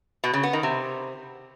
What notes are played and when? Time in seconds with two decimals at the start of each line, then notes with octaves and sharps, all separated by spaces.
0.24 B2
0.34 C#3
0.43 B3
0.53 D#3
0.63 C3